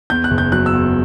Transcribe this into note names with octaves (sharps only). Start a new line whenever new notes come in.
E2 G6
F#6
F#1
G6
F#3 F#6
E6
E2